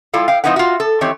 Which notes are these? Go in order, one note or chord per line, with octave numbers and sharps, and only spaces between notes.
G3 E4 F4 A4
F5 G5
F3 C4 D#4 E4 B4 F#5
F4 F#4
A4
D#3 E3 C4 G4 C#5